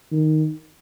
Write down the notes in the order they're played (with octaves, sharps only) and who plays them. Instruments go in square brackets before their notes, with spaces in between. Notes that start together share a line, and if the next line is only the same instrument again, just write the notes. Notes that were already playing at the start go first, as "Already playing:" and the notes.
[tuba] D#3